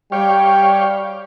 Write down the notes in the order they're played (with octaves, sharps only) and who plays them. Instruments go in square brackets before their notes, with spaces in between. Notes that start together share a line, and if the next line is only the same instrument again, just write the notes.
[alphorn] G3 [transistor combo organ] G4 C#5 F5 [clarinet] G5